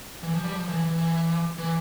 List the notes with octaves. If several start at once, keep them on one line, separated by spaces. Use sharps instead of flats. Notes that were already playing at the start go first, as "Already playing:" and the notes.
E3
F3
G3
F3
E3
E3
E3
E3